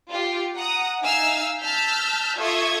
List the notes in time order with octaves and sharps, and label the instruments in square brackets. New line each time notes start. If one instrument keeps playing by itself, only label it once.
[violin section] F4 G4
F#5 A#5 D#6
D#4 E5 F5 G#5 E6 F6
A5 E6 F6 G6 B6
F4 A4 E5 C#6 D#6 G#6